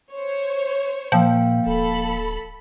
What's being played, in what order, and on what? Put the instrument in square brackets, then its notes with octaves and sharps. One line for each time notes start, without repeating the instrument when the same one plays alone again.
[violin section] C5 C#5
[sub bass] A#2 [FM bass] F3 [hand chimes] A#3 F5 G5
[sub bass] D1 [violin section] A4 B5